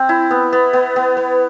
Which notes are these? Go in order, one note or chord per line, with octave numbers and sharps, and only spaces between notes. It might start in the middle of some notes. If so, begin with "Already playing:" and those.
Already playing: C4
E4
B3
B3
B3
B3
B3